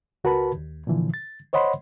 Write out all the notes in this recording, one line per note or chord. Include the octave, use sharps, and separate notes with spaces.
C#2 F#4 A#4 B4 A5 B5
D#2
A#2 D3 E3 F3
A6
C5 C#5 D#5 F#5 B5 C6